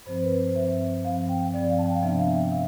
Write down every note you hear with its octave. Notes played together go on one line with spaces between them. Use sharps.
G2 F3 C4 C5
B4
C5
G2 F3 C4 E5
G2 F3 C4 F5
G5
G2 F3 C4 D5
F5
A5
G5
F5
C3 F3 B3 D4 E5
F5
E5
C3 F5